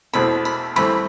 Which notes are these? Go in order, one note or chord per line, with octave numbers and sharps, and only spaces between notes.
E2 B2 A3 C4 B5
B5
G2 E3 A3 C4 B5